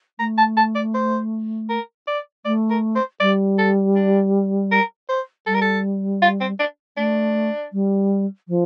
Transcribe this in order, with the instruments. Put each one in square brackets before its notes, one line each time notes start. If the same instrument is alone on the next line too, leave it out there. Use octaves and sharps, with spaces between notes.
[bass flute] A3 [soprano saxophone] A#5
[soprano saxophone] A5
A5
D5
C5
A#4
D5
[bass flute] A3 [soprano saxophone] D5
[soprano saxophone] A#4
C5
[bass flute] G3 [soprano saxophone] D5
[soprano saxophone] A4
D4
A#4
C5
[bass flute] G3 [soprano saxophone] A4
[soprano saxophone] A#4
A4
F4
C4
D4
[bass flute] A3 [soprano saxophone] D4
[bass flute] G3
F3